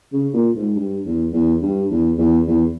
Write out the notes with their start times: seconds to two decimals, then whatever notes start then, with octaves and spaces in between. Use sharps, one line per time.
0.13 C#3
0.34 A#2
0.55 G#2
0.76 G2
1.05 E2
1.33 E2
1.62 G2
1.91 E2
2.18 E2
2.47 E2